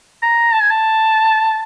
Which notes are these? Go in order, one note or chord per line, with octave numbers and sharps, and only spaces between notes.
A#5
A5
G#5
A5